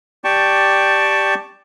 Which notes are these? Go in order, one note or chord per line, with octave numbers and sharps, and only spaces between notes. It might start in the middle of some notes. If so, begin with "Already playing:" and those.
G4 D5 G5 A5 C#6